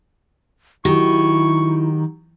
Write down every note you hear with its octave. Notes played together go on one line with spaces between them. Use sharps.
D#3 F#3 E4 G4 C#6